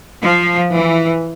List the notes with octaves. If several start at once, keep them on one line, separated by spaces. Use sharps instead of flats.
F3
E3